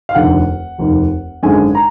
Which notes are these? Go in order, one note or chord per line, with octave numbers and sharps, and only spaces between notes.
F5
F1 D#2 D3 F#5
F1 D#2 D#3
G#1 F#2 D3 G#3 D4 G#5
A#5